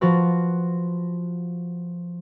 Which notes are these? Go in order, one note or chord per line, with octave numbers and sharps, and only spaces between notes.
F3 F4 F#4 B4